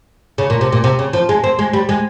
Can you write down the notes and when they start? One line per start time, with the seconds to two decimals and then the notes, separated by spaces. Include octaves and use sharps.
0.38 C#3
0.50 A#2
0.61 C3
0.72 A#2
0.84 C3
0.99 C#3
1.13 F3
1.29 G#3
1.44 C4
1.59 G#3
1.73 G3
1.89 G#3